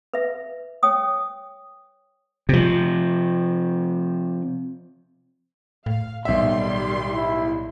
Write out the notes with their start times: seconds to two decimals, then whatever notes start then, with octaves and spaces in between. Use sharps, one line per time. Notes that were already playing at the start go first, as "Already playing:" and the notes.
0.14 B4 E5
0.83 C#5 G5 D#6
2.49 C3 F3
5.86 A2 F5
6.25 B1 D#3 G3 E5 C6
7.09 E4